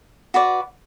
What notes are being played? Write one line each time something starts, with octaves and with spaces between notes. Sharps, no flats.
F#4 B4 D5